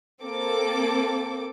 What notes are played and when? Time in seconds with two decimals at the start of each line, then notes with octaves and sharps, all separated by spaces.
0.24 A#3 C4 A4 D6